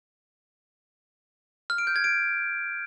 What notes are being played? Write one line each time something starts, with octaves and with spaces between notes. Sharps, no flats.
F6
D7
G6
G#6
D7